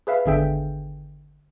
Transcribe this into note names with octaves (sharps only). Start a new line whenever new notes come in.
G#4 B4 E5 F5
G#1 E2 D3 G#4 E5 G5